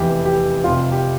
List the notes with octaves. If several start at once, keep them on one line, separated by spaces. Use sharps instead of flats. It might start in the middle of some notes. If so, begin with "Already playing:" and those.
Already playing: F1 E2 C3 E3 G4
G4
F1 F2 C3 F4
G4